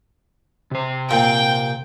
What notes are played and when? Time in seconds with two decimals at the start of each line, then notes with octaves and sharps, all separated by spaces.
0.71 C3 C5
1.11 A#2 G5